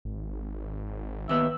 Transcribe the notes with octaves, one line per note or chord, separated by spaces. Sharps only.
G#1
D#2 B3 E5